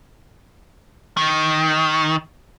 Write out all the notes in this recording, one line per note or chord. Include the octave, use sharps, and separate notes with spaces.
D#3